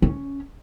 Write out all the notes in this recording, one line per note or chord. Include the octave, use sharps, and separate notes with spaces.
C#4